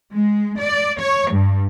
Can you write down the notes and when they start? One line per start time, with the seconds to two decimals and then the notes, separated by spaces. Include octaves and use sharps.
0.12 G#3
0.59 D5
0.99 C#5
1.32 G2